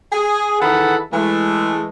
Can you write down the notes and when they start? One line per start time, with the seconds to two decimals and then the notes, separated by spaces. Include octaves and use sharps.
0.12 G#4
0.61 D#3 E3 G#4 A4 F#5 B5
1.12 E3 G#3 A3